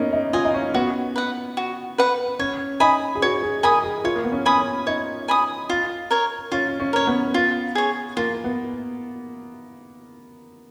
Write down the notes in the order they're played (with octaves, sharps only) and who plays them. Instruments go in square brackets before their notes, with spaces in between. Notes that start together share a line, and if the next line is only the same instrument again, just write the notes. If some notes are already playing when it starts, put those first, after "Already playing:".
Already playing: [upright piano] A#3 B3 C#4 D#4
D#4
[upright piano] F4 [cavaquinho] D#5 G#5
[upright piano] D#4
C#4
[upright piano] B3 [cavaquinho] F#4
[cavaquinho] B4 F#5
F#4
B4 F#5
[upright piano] C#4 [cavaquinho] C#5
[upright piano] D#4 [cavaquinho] G#5 B5 D#6
[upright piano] G#4
[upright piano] F#4 [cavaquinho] C#5
[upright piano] G#4
[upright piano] A#4 [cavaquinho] G#5 B5 D#6
[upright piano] G#4
[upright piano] F4 [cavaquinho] C#5
[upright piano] A#3
B3
C#4
[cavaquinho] G#5 B5 D#6
[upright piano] C#4
[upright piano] D#4 [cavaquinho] C#5
[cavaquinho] G#5 B5 D#6
F4
A#4 C#5
[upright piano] C#4 [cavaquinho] F4
[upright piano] C#4
[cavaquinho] A#4 C#5
[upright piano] B3
[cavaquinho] F4
G#4 C#5
[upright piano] A#3 [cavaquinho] F4
[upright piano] B3